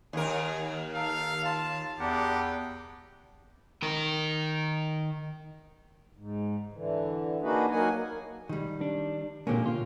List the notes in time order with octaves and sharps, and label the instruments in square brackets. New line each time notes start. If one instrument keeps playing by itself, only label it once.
[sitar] D#2 A#4 [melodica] G#5
[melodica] D#4 A4 [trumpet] F5
[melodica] F4 [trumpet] A5
[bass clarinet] E2 [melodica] D4 A#4 F#5 [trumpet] G4
[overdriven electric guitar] D#3 A#4
[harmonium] G#2
D3 E3
A#3 D4 D#4 F#4 G#4 B4
F#3 A#3 D#4 F#5 G#5
[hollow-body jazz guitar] D#3 G3
[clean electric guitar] D4
[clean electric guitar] A#2 D3 A#3 [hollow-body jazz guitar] C#4 G4
[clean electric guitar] F4